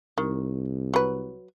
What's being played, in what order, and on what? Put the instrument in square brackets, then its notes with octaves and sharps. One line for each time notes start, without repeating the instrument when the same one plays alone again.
[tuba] C2 [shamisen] D#3
[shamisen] F#3 B4